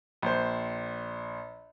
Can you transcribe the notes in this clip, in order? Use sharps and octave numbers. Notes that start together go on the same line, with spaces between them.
A#1 C5